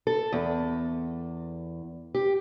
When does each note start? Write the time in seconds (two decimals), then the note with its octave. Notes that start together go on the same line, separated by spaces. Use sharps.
0.07 A4
0.33 E2
2.15 G4